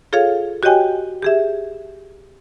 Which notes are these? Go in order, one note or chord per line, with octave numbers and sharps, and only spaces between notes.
F4 G#4 A4 C#5 F5
F#4 G4 C#5 D#5 G5 G#5
G4 G#4 E5